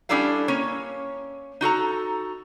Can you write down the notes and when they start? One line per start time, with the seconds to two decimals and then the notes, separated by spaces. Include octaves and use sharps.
0.09 G3 C#4 D4 E4 A4 F5
0.48 A#3 C#4 C#5
1.61 D#4 F#4 A4 A#5